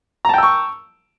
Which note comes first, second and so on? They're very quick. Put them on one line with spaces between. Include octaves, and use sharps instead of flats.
A#5 A5 G5 E6 C#6